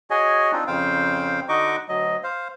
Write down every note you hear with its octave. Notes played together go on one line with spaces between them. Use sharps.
F#4 G#4 C#5 D#5 G#5
C4 D4 D#4 F4
F2 C#3 C5 F5 G5
D3 D#4 F#4 D#5 C#6 D6
D2 F#3 D#5
C5 F5